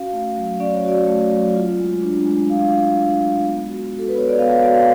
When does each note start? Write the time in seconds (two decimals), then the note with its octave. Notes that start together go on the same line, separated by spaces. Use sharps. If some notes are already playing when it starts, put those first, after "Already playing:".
Already playing: C#4 F#4 F5
0.13 A3
0.37 F#3
0.60 C#4 D5
0.74 C#5
0.85 F#4 D5
1.07 A3
1.31 F#3
1.56 F4
1.79 G#3
2.03 D4
2.26 G#3
2.50 F4 F5
2.74 G#3
2.97 D4
3.21 G#3
3.45 B3
3.68 F#4
3.92 F#4
3.99 A4
4.08 B4
4.15 B3 C#5
4.29 D5
4.39 B3 F5
4.51 C#5
4.62 F#4 D5
4.74 F5